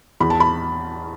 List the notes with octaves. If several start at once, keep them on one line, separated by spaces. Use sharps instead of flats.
E2 B5
A5
B5